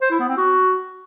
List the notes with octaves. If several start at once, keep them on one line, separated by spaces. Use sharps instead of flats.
C5
E4
B3
C4
F#4